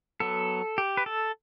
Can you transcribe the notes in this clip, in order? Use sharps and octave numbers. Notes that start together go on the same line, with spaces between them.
F#3 B3 A4
G4
B4
A4